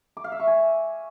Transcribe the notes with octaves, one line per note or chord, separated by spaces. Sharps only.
D6
F5
E5
C#6
G#5